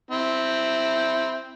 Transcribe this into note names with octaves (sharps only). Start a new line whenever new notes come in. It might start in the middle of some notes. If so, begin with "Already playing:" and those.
C4 E4